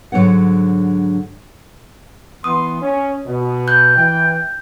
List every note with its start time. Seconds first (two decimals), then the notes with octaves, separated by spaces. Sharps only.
0.12 G#2 D3 F#3 C#4 C#5 F#5
2.44 E3 B3 C6 D#6
2.82 C#4
3.25 B2
3.68 F#6 G6
3.97 E3 G5